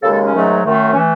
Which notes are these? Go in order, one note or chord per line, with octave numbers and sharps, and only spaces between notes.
D#2 C#3 G#3 A4
A4
C#4
G#2 D#3 F#3 A3
F#2 D#3 A3
E3 A3 C#4